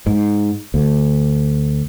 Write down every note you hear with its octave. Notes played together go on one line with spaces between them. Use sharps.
G#2
D2